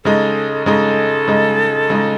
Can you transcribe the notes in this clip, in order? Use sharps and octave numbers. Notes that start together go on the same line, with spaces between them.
C#3 G#3 D#4 A4
C#3 G#3 D#4 A4
C#3 G#3 D#4
C#3 G#3 D#4